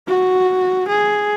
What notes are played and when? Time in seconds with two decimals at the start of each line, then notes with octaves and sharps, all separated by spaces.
0.08 F#4
0.89 G#4